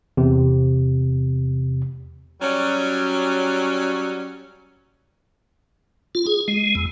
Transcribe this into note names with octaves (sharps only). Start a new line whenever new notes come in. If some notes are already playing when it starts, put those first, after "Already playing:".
E2 C3
F#3 G3 C#4
F4
G#4
G#3
E2